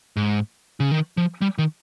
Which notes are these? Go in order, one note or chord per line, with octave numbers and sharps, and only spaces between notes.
G#2
C#3
D#3
F3
G3
D#3